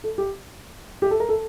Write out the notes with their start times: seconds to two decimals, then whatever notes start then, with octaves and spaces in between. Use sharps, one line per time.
0.04 A4
0.18 G4
1.02 G4
1.11 A4
1.20 A#4
1.29 A4